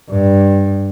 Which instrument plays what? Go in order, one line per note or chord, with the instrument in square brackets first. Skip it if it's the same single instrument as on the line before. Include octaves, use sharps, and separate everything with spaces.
[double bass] G2